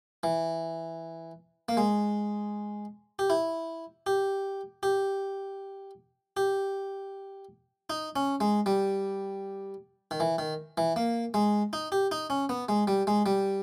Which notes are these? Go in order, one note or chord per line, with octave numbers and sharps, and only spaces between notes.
E3
A#3
G#3
G4
E4
G4
G4
G4
D#4
C#4
G#3
G3
D#3
E3
D#3
E3
A#3
G#3
D#4
G4
D#4
C#4
B3
G#3
G3
G#3
G3